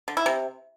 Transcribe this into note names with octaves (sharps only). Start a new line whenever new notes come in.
D3
E4
C3